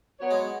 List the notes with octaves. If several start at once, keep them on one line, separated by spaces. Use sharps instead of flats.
F#3 B3 F#4 C#5
G#3